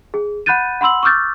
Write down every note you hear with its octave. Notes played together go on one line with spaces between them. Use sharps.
G#4
F#5 B5 F#6 G6 A6 D#7
F#5 B5 C6 E6 F#7
C#6 D6 E6 F6 G6 A6